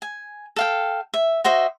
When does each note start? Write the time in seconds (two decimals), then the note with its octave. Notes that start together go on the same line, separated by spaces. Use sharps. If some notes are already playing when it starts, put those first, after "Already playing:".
0.02 G#5
0.56 A4 F5 G5
1.14 E5
1.44 F#4 C5 D#5 E5